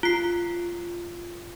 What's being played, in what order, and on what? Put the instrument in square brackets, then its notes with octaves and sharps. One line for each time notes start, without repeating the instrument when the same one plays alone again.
[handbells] F4 C7